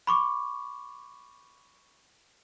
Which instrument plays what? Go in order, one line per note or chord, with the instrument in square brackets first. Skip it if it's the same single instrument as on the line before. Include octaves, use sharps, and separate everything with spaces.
[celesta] B5 C#6 D6